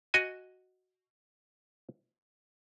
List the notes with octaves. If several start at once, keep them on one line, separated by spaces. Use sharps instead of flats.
F#4 D#5 G#5